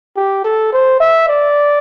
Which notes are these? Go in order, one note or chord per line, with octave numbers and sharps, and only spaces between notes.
G4
A4
C5
E5
D5